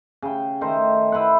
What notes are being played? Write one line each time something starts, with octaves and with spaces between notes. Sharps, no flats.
C#3 G5
D#3 A3 D#4 C5
E4 B4 C5 F#5